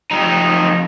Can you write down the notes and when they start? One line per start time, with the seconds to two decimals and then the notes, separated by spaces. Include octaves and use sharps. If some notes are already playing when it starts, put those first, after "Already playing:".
0.11 F2 D#4